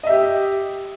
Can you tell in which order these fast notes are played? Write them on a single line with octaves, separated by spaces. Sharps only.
D#5 E5 G4